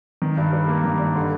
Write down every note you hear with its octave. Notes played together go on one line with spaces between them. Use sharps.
D#3
G2
G3
A#3
D#3
G2
D3